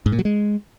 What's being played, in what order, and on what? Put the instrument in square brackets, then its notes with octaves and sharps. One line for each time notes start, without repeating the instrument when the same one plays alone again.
[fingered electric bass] G#2
A#2
F#3
G#3